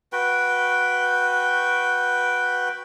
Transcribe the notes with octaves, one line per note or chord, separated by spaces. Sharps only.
F#4 B4 G5